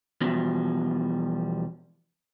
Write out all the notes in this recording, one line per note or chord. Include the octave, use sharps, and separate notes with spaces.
E2 B2 F3 G3